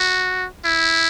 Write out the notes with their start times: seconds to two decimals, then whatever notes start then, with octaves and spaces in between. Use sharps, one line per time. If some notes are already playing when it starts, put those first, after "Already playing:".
Already playing: F#4
0.65 E4